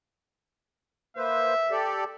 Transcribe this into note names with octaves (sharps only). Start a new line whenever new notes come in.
A#3 B4 C5 E5
G4 A4 D5